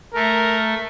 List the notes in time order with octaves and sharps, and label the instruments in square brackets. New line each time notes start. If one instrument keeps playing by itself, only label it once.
[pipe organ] A3 [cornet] A#4